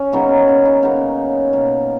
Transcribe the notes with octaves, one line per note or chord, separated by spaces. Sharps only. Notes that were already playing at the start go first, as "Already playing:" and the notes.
Already playing: C#4
C#3 F#3 A#3 B3 D#4
C#4
B3 D#4
C#3 F#3 A#3 B3 D#4
B2 A#3